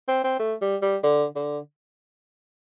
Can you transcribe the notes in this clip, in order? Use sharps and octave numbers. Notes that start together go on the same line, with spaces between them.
C4
C4
A3
G3
G3
D3
D3